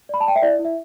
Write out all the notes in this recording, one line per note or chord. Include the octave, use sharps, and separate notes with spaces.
D5 B5
A5
D5 G5
E5
E4 D5
E4
E5